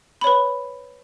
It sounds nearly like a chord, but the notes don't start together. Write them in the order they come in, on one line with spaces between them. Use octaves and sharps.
B5 C#5 B4